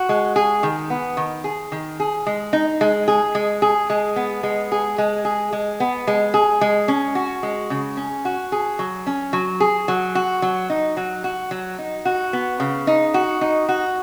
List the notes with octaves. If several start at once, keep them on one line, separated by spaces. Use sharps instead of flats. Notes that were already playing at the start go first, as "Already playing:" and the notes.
Already playing: F#4
G#3
G#4
D#3
B3
D#3
G#4
D#3
G#4
G#3
D#4
G#3
G#4
G#3
G#4
G#3
B3
G#3
G#4
G#3
G#4
G#3
B3
G#3
G#4
G#3
C#4
F#4
G#3
C#3
C#4
F#4
G#4
F#3
C#4
F#3
G#4
F#3
F#4
F#3
D#4
F#3
F#4
F#3
D#4
F#4
B3
C#3
D#4
F#4
D#4
F#4